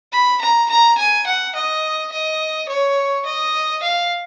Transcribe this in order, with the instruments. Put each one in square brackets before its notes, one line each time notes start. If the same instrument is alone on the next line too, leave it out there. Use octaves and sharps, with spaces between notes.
[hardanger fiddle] B5
A#5
A#5
G#5
F#5
D#5
D#5
C#5
D#5
F5